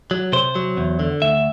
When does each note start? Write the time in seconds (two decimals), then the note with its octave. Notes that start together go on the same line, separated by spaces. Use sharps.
0.11 F#3
0.33 C3 C5
0.55 F#3
0.77 E2
1.00 D3
1.22 D2 E5